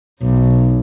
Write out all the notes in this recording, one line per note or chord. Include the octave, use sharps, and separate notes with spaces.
B1